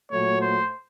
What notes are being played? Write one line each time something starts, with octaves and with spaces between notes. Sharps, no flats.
A#2 F#3 A3 C#5
C5